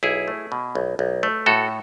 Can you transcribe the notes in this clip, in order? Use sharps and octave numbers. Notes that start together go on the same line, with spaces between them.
B1 E4 G#4
A3
B2
B1
B1
A3
A2 F#4 A4